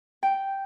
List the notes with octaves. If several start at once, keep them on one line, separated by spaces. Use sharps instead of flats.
G5